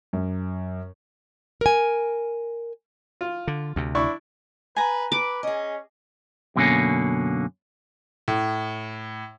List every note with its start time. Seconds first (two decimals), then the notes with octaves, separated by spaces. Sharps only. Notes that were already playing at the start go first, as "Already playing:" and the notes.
0.13 F#2
1.61 A#4 G#5
3.21 F4
3.47 D3
3.76 D2 C3
3.95 D4 E4 C#6
4.76 B4 G#5 A#5
5.12 B4 D6
5.43 C#4 G#4 D#5
6.56 F#2 B2 D3 G#3 A#3 C#4
8.28 A2